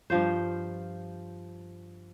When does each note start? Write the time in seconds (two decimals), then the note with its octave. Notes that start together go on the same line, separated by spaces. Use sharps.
0.10 G2 F3 F4 C5